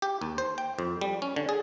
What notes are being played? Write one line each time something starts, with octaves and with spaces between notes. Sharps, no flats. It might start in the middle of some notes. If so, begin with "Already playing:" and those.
G4
D#2
C5
G5
F2
G3
C#4
D3
G#4